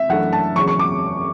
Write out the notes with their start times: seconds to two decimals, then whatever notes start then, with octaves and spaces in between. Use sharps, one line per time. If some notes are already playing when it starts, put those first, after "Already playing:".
Already playing: E5
0.09 F#2 E3 A3 D4 F#5
0.33 A5
0.56 F#1 E2 C#3 F#3 C#4 C#6
0.67 C#6
0.79 D6